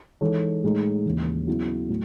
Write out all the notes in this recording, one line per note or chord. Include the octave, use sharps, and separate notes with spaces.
E3 G#3 D#4 A4 C#5
A2 G#3 D#4
D#2 C#3 E3
C#3 F#3 B3 E4
A2 F#3